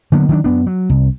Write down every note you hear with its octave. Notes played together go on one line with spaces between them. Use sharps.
D3 F#3 A#3 B3
D#3 F#3 C4 D4
F#2 B3 D4
F#3
C2